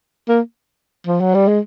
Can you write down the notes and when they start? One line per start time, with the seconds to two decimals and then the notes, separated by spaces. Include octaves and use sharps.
0.29 A#3
1.07 F3
1.21 F#3
1.35 G3
1.48 G#3